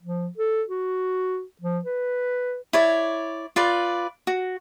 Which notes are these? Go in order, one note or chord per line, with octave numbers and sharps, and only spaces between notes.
F3
A4
F#4
F3
B4
E4 C#5 D5
F4 B4 D5
F#4